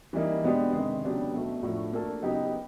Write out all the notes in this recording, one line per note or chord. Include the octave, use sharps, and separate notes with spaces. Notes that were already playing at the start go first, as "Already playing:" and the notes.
E3 G3 A#3 D#4
B2 G#3 B3 D4 G4
C3 D#3 G#3
C#3 F#3 B3 D4 G4
B2 F#3 A3
A2 F3 A3 D4 F#4
A#3 D4 F#4 A4
C#3 F#3 B3 D#4 G4